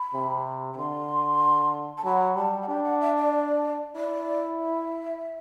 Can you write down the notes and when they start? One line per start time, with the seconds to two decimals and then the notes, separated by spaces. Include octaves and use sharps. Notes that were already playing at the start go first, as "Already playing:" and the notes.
Already playing: B5
0.14 C3
0.73 B5
0.77 D3 C6
1.97 A5
2.05 F#3 B5
2.36 G3 A5
2.62 F#5
2.68 D4 G5
2.84 F#5
3.00 E5
3.16 D5
3.96 E4 D5
4.59 E5